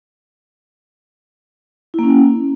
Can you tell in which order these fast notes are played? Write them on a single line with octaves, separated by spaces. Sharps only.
E4 A#3 C#4